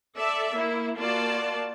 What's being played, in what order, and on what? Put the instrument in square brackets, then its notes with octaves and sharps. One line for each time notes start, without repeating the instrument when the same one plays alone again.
[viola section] A4 D5 E5
A#3 E4
A#3 F4 F#4 D5 A5